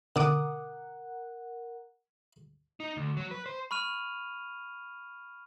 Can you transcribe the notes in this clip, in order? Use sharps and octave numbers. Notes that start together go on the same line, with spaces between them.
B2 D3 A#4 F#5 D6 D#6
D#4
D2
F#3
B4
C5
B5 C#6 F6 D#7 F7